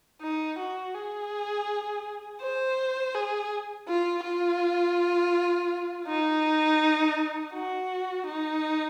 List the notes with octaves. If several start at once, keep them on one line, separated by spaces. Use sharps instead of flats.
D#4
F#4
G#4
C5
G#4
F4
F4
D#4
F#4
D#4